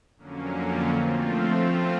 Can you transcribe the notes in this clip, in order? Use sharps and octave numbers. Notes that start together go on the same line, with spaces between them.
F2 D3 F#3 A#3 C#4
F3 A3 C4 F4
F3 A3 C4 F4